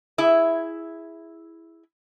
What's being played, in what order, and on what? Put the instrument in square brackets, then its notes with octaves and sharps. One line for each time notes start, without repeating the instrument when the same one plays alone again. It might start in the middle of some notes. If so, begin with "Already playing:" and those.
[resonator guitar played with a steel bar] E4 G#4 E5